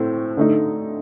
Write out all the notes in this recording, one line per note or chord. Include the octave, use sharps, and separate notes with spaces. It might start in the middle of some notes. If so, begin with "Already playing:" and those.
Already playing: A2 A3 C4
D3 A3 D#4